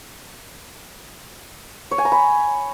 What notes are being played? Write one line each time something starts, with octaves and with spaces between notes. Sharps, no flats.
C#5
G#5
A#5
B5